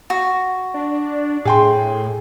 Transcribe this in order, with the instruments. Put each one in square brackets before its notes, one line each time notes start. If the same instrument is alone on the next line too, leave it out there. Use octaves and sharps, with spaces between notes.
[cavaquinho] F#4
[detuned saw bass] D4
[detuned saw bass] A2 [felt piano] G#4 G5 C6